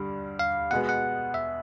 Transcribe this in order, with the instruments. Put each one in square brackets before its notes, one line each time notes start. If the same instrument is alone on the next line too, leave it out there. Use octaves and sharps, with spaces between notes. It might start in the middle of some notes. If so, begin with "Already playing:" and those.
Already playing: [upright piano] G2 D3 G3
[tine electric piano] F5
[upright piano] B2 G#3 B3 [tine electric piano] F#5
[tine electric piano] F#5
E5